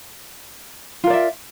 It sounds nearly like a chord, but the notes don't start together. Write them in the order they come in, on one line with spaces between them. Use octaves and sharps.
F4 A#4 D5 E5